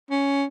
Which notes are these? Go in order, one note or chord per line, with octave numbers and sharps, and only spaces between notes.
C#4